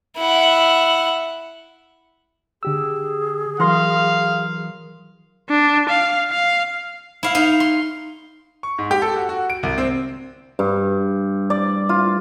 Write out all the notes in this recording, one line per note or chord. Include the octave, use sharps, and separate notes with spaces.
E4 F#5
D3 G4 G#4 E6
E3 F#3 A#4 F5 C6 A#6
D4
F5
F5
E4 F5
D#4 F5
C6
C#6
G#2
G4
A4
F#4
F#4
D7
C2
C4
G2
D5
F4